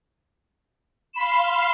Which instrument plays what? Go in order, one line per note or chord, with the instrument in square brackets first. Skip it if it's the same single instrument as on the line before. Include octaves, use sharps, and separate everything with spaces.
[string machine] F5 C6 [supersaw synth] B5 E7